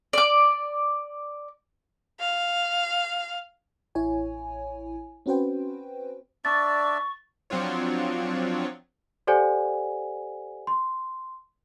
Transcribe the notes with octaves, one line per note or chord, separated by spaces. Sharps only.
D5 D6
F5
A1 E4 C#5 G#5
C4 C#4 F#4 B4 C5 G5
D4 D5 E5 C#6 A6
F3 F#3 C4 D4 F4 C#5
G4 A4 C5 D5 F#5 G#5
C6